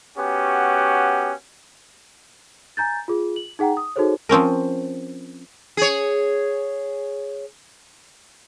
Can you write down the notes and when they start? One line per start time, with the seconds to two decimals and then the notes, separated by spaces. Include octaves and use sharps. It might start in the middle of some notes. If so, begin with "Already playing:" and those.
0.17 B3 C#4 F#4 G4
2.77 G#5 A#5 G6 A6
3.08 F4 G#4
3.36 F#7
3.59 D#4 G#4 F#5 G5 A#5
3.77 D#6
3.96 D#4 F#4 G#4 A4 C5 C#5
4.29 F3 C4 C#4 A#4
5.77 G#4 C#5